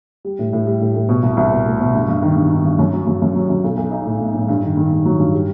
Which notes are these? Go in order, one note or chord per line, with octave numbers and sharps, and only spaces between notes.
G3
A2
A2
G3
A2
A2
B2
C2
C2
B2
A3
B2
G2
G2
D#3
G2
D#3
G2
F#2
F#3
F#2
F#2
F#3
F#2
B1
B1
D#4
A2
A2
A2
G2
D#3
D#3
G2
F#3
G2
G3